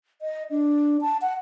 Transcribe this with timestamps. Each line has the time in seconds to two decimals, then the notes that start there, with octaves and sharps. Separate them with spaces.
0.22 D#5
0.51 D4
1.01 A5
1.22 F#5